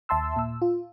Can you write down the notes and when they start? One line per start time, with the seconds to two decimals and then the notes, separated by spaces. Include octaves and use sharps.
0.09 D#2 E5 A5 C6 E6
0.36 A#2 E6
0.62 F4